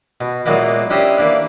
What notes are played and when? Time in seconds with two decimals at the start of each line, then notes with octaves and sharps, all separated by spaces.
0.21 B2
0.46 A#2 E3 F#3 G#3 A#3 B3
0.90 C#4 D4 E4 G4 C5 D#5
1.18 E3 A#3 D4